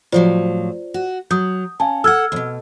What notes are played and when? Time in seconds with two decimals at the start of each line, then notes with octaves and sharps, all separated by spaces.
0.12 A2 F3 F#3 F4 C5 D5
0.94 F#4
1.31 F#3 D#6 G6
1.80 C#4 F5 G#5 A5
2.04 A4 F#5 E6 F6 G#6
2.32 D#2 B2